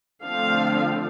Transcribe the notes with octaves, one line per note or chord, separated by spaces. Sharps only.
D3 F3 A3 C4 F5